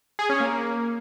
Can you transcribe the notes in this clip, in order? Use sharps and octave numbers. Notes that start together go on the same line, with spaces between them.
G#4
C#4
A#3